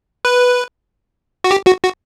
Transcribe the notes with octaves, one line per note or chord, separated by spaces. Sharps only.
B4
F#4
G4
F#4
F#4